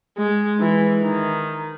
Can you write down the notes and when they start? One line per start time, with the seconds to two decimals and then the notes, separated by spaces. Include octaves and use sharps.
0.18 G#3
0.60 E3
1.03 D#3